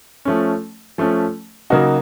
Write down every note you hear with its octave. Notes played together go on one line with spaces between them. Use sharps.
F3 A3 C#4
F3 A3 C#4
C#3 F#3 A#3 D#4 F#4